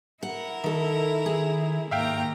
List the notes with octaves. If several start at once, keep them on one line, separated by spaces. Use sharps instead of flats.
E4 A#4 F#5
D#3 A4
D#3 G#4
D#2 G#2 E5 F5 G5 A#5